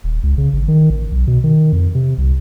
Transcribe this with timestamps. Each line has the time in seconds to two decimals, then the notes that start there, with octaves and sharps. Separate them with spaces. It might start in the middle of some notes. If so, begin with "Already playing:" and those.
0.04 D#1
0.23 C#2
0.38 C#3
0.53 G#1
0.68 D#3
0.90 A1
1.12 B1
1.27 B2
1.44 D#3
1.72 F2
1.95 C3
2.18 C2